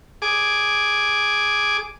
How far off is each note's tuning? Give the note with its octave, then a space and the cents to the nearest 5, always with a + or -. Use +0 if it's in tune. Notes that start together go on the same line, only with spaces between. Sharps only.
G#4 +0 D6 +0